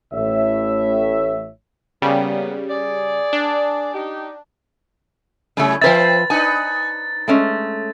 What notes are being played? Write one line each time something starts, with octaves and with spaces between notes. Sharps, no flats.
A1 A2 C#5 E5
C#3 G3 A#3 B3
G#4 D5
D4
D#4 G4
C#3 F#3 A3 C#4 E4
F3 C4 B4 C5 E5 A6
D4 D#4 B4 G#5
G#3 A3 C#4